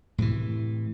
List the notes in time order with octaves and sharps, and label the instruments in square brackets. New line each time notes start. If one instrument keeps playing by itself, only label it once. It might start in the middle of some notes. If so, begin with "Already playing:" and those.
[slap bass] A2 C3 D#3 E3